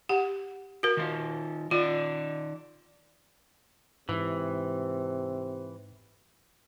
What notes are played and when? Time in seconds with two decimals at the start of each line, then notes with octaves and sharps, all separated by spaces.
0.09 G4 F#5
0.83 F#4 A#4
0.97 D#3 F4
1.71 D#3 F4 D5
4.09 G#2 C3 E3